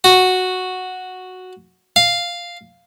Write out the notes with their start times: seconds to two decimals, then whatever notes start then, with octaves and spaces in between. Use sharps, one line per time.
0.04 F#4
1.96 F5